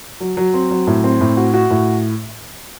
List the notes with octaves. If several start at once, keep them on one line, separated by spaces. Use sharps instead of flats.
F#3
F#3
C4
F#3
A2
C4
A2
F#4
F#4
A2